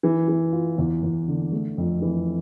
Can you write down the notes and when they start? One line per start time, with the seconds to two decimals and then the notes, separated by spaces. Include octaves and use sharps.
0.03 E3
0.28 E3
0.52 F4
0.78 E2
1.03 E2
1.28 D3
1.52 A3
1.78 F2
2.02 E3